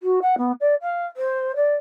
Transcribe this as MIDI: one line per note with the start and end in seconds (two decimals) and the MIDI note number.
0.01 0.19 66
0.21 0.35 78
0.37 0.52 59
0.60 0.74 74
0.81 1.05 77
1.16 1.55 72
1.55 1.74 74